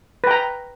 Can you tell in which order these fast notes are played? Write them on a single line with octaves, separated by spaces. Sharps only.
B4 G5 A#5